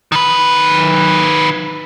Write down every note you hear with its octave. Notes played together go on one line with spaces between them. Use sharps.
D#3 B4